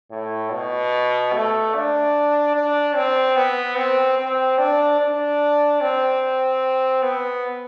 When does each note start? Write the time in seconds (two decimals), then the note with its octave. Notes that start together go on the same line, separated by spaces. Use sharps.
0.11 A2
0.52 B2
1.33 A3
1.74 D4
2.55 D4
2.96 C4
3.36 B3
3.77 C4
4.19 C4
4.58 D4
5.00 D4
5.81 C4
7.03 B3